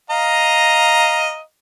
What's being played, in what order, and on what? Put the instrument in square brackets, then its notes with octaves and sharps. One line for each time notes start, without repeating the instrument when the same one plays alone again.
[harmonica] D#5 F5 A#5